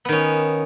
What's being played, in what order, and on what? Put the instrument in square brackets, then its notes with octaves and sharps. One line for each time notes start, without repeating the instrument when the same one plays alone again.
[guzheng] B3
D#3
C#4